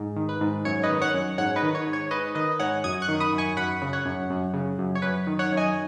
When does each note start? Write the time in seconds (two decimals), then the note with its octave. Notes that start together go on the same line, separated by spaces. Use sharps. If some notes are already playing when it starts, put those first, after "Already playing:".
Already playing: G#2
0.16 D#3
0.29 B4
0.41 G#2
0.65 F#2 C#5
0.83 B4 D#5
0.89 D#3
1.02 C#5 F#5
1.14 F#2
1.38 G#2 C#5 F#5
1.56 B4 D#5
1.62 D#3
1.75 C#5
1.87 G#2
1.93 C#5
2.11 G#2 B4 D#5
2.35 D#3 B4 D#5
2.59 G#2 C#5 F#5
2.84 F#2 D#6 G#6
3.02 C#6 F#6
3.08 D#3
3.20 B5 D#6
3.33 F#2
3.38 G#5 C#6
3.57 F#2 F#5 B5
3.82 C#3
3.93 C#5 F#5
4.06 F#2
4.30 F#2
4.54 C#3
4.78 F#2
4.95 C#5
5.02 F#2 B4
5.27 D#3
5.39 C#5 F#5
5.52 F#2
5.57 D#5 G#5